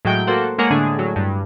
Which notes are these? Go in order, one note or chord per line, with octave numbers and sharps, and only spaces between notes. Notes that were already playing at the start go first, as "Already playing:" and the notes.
A2 F#3 G#3 G5 G6 D7
A#3 F#4 A4 C5 F#5
G#3 A#3 G#4 A#4 C#5 F#5
A2 D3 D4 G#4
A2 F#3
G2